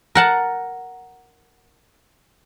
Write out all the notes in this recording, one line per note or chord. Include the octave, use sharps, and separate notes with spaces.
A#4 F#5 A5